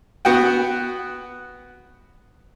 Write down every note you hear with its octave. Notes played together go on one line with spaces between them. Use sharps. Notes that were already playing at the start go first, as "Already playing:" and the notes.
B3 F#4 F#5 G5